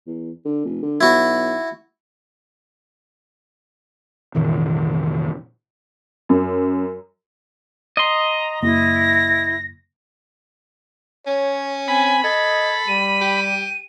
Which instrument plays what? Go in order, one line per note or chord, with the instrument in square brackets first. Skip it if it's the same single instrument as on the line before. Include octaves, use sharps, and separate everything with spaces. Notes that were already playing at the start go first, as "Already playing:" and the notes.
[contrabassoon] E2
D3
F1
D3
[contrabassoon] B1 [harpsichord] E4 F#4
[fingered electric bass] F1 A#2 D#3 E3
[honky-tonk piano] F#2
[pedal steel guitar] D#5 C6 [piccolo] A#5
[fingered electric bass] F#1 A#3 [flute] E4 [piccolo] A#6
[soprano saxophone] C#4 [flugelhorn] C#5
[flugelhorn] C4 [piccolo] G#5 [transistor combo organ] B5
[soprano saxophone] A4 [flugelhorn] D#5 [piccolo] G#6
[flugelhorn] G3 [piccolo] D#7
[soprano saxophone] G4